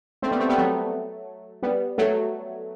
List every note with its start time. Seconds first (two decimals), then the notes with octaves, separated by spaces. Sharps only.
0.22 A3 C4
0.31 G3 B3
0.39 A3 C4
0.49 G3 B3
0.58 F#3 A3
1.63 G3 B3
1.98 F#3 A3